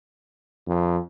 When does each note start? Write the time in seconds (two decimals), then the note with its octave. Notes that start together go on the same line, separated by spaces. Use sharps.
0.67 F2